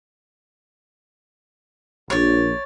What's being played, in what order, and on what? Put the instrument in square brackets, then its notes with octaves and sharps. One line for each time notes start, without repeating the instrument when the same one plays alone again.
[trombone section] A#1 [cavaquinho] C#5 D5